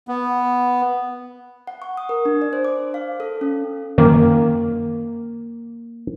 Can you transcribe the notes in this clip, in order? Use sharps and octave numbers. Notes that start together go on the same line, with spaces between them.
B3
F#5
C#6
D#6
A#4
D4
D5
C5
D6
F5
A4
C#4
F#2 D#3 A#3